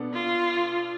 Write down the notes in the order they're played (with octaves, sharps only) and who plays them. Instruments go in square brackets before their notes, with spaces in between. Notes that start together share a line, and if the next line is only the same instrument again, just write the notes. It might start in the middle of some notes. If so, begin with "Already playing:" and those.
Already playing: [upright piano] B2 B3 D4 A4
[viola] F4